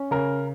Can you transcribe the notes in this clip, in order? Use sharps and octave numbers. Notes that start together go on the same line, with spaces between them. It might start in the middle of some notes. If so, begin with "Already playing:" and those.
Already playing: C#4
C#3 A#4